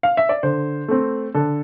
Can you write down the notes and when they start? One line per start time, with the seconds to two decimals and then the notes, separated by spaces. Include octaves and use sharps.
0.03 F5
0.17 E5
0.29 D5
0.43 D3 C5
0.88 A3 C4
1.34 D3 A4